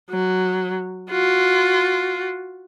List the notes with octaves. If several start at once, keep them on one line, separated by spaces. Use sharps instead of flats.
F#3
F4 F#4